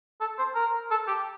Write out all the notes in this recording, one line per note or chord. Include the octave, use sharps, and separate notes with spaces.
A4
C5
A#4
A4
G4